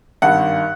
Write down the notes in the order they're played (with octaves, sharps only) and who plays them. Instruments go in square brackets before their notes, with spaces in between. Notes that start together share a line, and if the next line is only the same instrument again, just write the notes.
[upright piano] G#1 G2 D#3 F#5